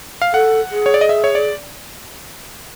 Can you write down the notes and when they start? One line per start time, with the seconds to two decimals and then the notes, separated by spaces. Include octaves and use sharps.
0.22 F5
0.34 A4 F#5
0.71 G#4
0.86 C#5
0.94 D5
1.01 D#5
1.09 E5
1.24 C#5
1.35 D5